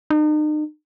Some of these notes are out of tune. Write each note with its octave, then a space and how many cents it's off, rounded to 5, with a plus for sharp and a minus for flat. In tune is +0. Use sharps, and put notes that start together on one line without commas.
D#4 -40